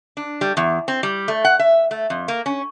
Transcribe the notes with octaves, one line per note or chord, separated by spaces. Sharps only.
D4
G3
E2
C4
G3
A3
F#5
E5
A3
F2
A#3
C#4